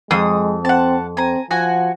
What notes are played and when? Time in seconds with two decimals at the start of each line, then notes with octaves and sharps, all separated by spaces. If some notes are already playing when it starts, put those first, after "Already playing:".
0.11 F2 G#3 D#6
0.65 C4 F#5 A5
1.17 C4 G#5 A#5
1.51 F3 F#4 F#5 G#5